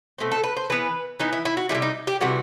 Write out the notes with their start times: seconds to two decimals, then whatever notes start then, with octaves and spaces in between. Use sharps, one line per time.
0.18 B2 A3 C4
0.32 A4
0.44 B4
0.57 C5
0.70 E3 B3 B4
1.20 E3 B3 D#4
1.33 E4
1.45 E4
1.57 F#4
1.69 E3 G3 E4
1.75 C3
1.82 D#4
2.07 G4
2.21 C3 E3 G3 F#4